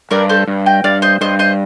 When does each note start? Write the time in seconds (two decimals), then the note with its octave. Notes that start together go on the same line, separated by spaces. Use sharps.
0.11 G2 A#4 D5
0.29 A4 C5
0.47 G2
0.66 D#5 G5
0.84 G2 D5 F5
1.02 C5 D#5
1.21 G2 C5 D#5
1.39 C5 D#5